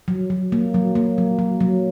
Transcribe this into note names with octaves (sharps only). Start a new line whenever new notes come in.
F#3
F#3
A#3
F#3
A#3
F#3
F#3
F#3